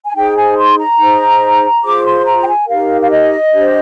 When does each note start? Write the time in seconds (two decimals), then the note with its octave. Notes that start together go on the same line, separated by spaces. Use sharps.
0.05 G#5
0.14 D#4 G#4 C5 G5
0.36 G#5
0.56 C6
0.77 A#5
0.98 D#4 G#4 C5
1.83 F4 G#4 C5 D6
2.05 C6
2.25 A#5
2.41 G5
2.47 G#5
2.67 D#4 G4 A#4 F5
3.01 F5
3.09 D#5
3.51 D4 G4 C5